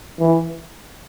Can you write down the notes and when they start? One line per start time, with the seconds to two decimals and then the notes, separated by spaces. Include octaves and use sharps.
0.19 E3